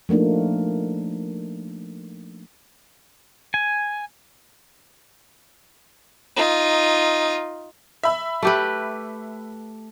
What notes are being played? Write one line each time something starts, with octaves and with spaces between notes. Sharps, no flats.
F3 A3 A#3 D4 D#4
G#5
D#4 F4
E5 B5 E6
A3 G4 B4